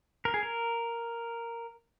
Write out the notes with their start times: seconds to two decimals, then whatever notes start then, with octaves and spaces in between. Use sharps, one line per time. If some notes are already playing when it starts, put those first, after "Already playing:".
0.25 A#4
0.34 G#4
0.43 A#4